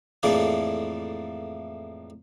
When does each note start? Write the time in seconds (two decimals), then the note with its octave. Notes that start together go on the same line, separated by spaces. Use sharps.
0.23 F2 A2 E3 A#3 D4 G#4